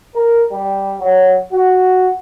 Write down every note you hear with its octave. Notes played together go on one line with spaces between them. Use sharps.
A#4
G3
F#3
F#4